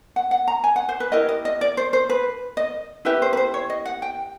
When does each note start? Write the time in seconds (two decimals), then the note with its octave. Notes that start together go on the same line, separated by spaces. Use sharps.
0.16 F#5
0.31 F#5
0.48 A#5
0.64 G#5
0.76 F#5
0.89 C5
1.00 B4
1.12 E4 G4 A#4 D#5
1.29 D#5
1.45 D#5
1.61 D5
1.77 C5
1.93 C5
2.09 B4
2.57 D#5
3.05 C#4 E4 G4 B4 E5
3.22 C5
3.33 B4
3.37 C5
3.54 C#5
3.70 D#5
3.85 F#5
4.02 G5